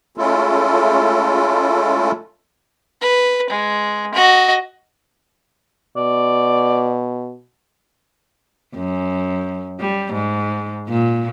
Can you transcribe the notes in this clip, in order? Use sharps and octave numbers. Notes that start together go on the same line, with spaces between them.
G#3 A3 C#4 E4 F4 A4
B4
G#3
F#4 D#5
B2 D5
F#2
G3
G#2
A#2